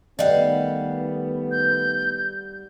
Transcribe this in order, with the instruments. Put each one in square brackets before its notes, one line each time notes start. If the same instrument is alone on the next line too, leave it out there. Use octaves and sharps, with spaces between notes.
[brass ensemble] D#3 A3 B3 [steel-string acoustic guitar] G3 F5 F#5 [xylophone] D5 D#5
[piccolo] G6